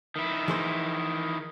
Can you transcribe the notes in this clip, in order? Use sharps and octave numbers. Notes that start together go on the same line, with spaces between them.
D#3 E4
E3 G#4 C5